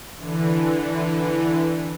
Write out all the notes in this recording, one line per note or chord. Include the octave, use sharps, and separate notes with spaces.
D3 E3